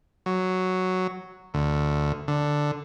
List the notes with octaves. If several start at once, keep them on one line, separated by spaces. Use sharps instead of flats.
F#3
D2
D3